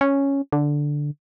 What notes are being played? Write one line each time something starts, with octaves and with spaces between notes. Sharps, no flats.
C#4
D3